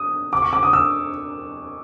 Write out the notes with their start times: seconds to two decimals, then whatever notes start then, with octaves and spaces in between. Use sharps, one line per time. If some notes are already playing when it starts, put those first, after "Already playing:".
Already playing: D#6
0.33 D6
0.42 C#6
0.53 D6
0.63 D#6
0.73 E6